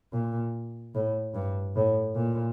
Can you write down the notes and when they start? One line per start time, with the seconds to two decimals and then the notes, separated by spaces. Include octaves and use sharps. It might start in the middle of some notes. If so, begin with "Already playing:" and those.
0.13 A#2
0.95 A2
1.35 G2
1.76 A2
2.16 A#2